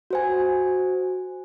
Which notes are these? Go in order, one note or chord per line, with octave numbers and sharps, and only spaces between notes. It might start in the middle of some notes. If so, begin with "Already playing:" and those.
F#4 C5 G#5